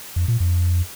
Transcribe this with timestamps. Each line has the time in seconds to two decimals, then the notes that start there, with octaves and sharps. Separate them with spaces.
0.16 F2
0.28 A#2
0.40 F2